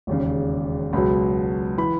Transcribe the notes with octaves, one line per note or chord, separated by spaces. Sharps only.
E1 D#2 C#3
C#2 B2 F#3 B5
E3 B5